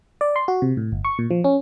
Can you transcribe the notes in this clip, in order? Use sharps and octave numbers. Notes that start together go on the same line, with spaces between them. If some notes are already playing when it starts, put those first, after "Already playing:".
D5
C6
F#4
C3
A2
G1
C#6
A#2
F3
C#4